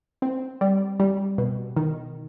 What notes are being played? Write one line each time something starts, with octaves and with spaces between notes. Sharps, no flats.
C4
G3
G3
B2
D#3